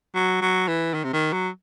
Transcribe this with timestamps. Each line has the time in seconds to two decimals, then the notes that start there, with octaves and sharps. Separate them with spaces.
0.15 F#3
0.41 F#3
0.68 E3
0.94 D#3
1.04 C3
1.13 D#3
1.33 F#3